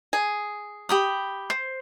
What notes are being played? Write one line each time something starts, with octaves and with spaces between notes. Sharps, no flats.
G#4
G4 B5 D#6
C5